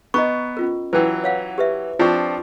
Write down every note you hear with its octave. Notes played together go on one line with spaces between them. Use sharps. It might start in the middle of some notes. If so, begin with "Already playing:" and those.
B3 D#5 A#5 C#6
C#4 F4 A#4
E3 F#3 B4 G5
C#5 F5 F#5
G4 B4 E5
F3 C4 D4 F4 C#6